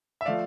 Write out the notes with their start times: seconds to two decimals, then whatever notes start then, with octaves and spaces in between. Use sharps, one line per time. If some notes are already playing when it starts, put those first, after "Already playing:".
0.21 E5
0.25 F3 A3 D5 F5